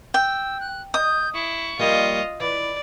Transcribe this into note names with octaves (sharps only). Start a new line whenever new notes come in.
G5 E6
F#6
D#5 D#6 G6
E4 C#6
F3 G3 A#3 F4 D#5
E3 D5